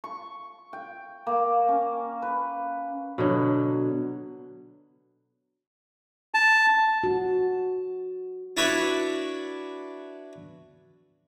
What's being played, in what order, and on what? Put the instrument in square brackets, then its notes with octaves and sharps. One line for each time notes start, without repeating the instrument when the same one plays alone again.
[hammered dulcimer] C#6
G5
A#3
C#4
B4
[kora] B2 D3 F#3
[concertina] A5
[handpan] F#4
[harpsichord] D4 E4 F#4 B4 C#5 D5